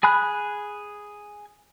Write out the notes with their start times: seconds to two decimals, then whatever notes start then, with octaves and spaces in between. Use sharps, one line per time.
0.03 G#4 G#5 B5 F#6